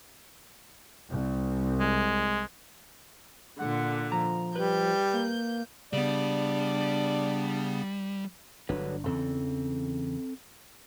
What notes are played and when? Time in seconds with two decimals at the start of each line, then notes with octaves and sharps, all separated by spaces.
1.09 C2
1.80 G#3
3.59 A#2 D3 F#5
4.12 F3 A#5
4.56 G3 B4 G6
5.13 A#3
5.93 C#3 G3 B3 D4 D5
8.69 G1 D3 F#3 D4 B4
9.06 E2 C#3 E3 C4 A4